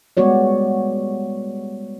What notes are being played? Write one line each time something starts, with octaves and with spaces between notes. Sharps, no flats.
G3 G#3 B3 F#4 C#5 D5